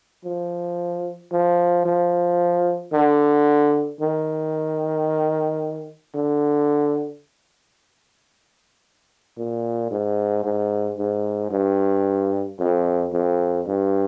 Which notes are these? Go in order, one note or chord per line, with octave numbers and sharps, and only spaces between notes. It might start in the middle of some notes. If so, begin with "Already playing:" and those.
F3
F3
F3
D3
D#3
D3
A#2
G#2
G#2
G#2
G2
F2
F2
G2